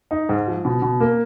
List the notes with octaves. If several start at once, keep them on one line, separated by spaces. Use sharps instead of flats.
D#4
G#2
F3
B2
B2
A#3